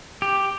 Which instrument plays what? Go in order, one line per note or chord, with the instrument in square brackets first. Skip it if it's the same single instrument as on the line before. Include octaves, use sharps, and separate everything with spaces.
[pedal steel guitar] G4